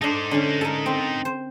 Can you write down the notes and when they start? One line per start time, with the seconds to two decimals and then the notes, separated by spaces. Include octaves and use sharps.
0.02 D4 D#4 A4 C5
0.31 D3 C#4
0.61 A4 A#4
0.86 C4
1.25 C5